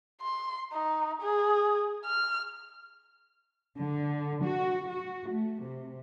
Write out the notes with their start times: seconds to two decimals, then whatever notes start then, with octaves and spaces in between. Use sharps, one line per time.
0.21 C6
0.73 D#4
1.22 G#4
2.05 F6
3.77 D3
4.45 F#4
4.89 F#4
5.31 A3
5.63 C3